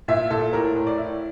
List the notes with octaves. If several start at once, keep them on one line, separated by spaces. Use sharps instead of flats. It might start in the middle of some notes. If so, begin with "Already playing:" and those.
A#2 E5
A#2 A4
A2 A#4
A2
D5
E4